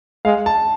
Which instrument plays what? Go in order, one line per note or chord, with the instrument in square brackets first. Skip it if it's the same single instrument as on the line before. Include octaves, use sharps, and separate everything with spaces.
[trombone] G#3 [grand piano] F5
[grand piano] A5